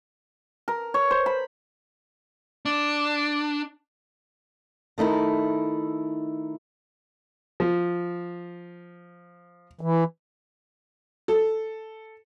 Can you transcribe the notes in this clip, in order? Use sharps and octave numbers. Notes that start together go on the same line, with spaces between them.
A#4
C#5
C5
B5
D4
D#3 A3 D#4 E4
F3
E3
A4